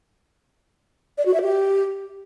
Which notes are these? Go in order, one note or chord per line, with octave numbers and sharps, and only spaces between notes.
D5
F#4
E5
G4